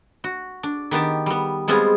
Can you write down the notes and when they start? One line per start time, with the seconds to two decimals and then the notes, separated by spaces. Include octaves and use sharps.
0.24 F#4
0.63 D4
0.91 D#3 B3 G4 A5
1.26 G3 B3
1.68 G3 G#3 B3 C4 F4 G#4